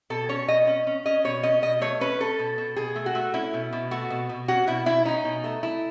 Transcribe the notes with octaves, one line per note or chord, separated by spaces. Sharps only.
B2 A4
C#4 C#5
B2 D#5
C#4
C#4
C#4 D#5
B2 C#5
C#4 D#5
B2 D#5
A3 C#5
C#4 B4
C#4 A4
B2
B2
B2 G#4
A3
F#4
A3
C#4 E4
B2
B2
A3 F#4
B2
B2
C#4 F#4
B2 E4
B2 E4
C#4 D#4
B2
A3
A3 E4